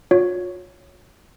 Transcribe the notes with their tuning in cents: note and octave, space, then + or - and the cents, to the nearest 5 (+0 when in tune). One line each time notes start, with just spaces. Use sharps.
F4 +40 C#5 +0